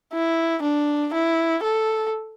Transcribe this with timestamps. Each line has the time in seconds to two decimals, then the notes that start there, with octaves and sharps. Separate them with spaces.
0.13 E4
0.63 D4
1.14 E4
1.64 A4